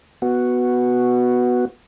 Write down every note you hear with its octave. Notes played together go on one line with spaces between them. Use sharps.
B3 F#4